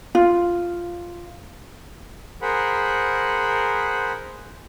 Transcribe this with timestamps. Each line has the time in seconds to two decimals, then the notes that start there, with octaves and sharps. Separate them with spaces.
0.15 F4
2.42 G#4 A#4 C5 F#5 B5